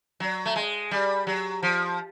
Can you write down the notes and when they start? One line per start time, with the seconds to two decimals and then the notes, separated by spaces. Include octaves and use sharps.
0.20 F#3
0.46 A3
0.56 G#3
0.91 G3
1.27 F#3
1.63 F3